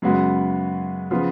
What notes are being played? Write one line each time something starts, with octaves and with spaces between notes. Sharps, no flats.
F#2 C#3 G#3 B3 F#4
C#3 F3 B3 F4